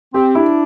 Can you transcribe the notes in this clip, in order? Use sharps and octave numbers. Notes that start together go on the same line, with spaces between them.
C4 G4
D4 E4